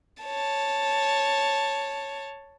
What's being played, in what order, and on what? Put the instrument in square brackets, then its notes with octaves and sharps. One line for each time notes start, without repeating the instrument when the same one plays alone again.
[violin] C#5 A5